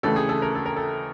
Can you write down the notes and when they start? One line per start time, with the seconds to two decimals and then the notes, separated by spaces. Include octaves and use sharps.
0.03 D#2 C#3 E3 A3 A4
0.16 G#4
0.29 A4
0.42 A#4
0.55 A4
0.66 A#4
0.76 A4